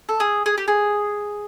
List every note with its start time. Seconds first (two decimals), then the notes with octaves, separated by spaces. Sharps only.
0.09 A4
0.20 G#4
0.46 G#4
0.58 G4
0.68 G#4